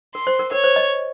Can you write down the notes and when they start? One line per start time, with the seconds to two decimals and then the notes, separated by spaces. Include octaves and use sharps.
0.15 A#4 C6
0.27 C5
0.39 A#4
0.52 A#4 C#5
0.64 C5
0.76 D#5